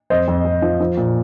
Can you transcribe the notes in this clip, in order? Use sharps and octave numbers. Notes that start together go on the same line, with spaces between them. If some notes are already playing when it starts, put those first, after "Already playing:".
F2 C5 D#5
F2
F2
F3
F3
A#2